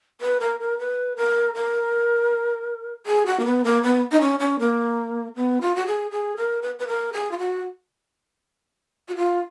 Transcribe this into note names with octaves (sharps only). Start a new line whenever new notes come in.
B4
A#4
A#4
B4
A#4
A#4
G#4
F#4
A#3
B3
A#3
B3
D#4
C#4
C#4
A#3
B3
F4
F#4
G#4
G#4
A#4
B4
B4
A#4
G#4
F4
F#4
F#4
F4